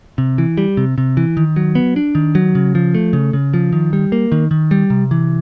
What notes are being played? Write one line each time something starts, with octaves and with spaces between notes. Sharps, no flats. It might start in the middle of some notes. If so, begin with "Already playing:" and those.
C3
E3
G3
C3
C3
E3
D#3
F#3
B3
D4
D#3
F#3
C#3
F3
A3
C#3
C#3
F3
D#3
G3
A#3
D#3
D#3
G3
C3
E3